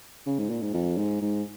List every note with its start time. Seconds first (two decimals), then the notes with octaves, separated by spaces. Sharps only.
0.26 C#3
0.38 G#2
0.49 A#2
0.62 G#2
0.74 F2
0.97 G#2
1.22 G#2